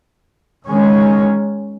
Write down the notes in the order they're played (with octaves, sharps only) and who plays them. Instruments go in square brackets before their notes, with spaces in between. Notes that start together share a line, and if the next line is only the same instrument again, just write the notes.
[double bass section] D#3 G#3 C#4